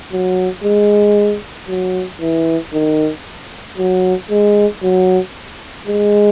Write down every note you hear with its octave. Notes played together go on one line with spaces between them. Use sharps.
F#3
G#3
F#3
E3
D#3
F#3
G#3
F#3
G#3